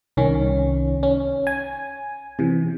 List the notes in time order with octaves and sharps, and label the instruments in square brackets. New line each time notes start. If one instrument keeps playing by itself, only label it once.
[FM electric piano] C2 D#3 C#4
C#4
G#5
C3 E3